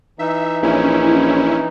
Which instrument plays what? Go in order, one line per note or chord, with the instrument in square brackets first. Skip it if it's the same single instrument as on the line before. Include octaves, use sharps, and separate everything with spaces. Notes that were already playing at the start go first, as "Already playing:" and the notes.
[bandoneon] E3 D#4 [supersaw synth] E5
[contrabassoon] A#1 [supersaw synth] C#4 E4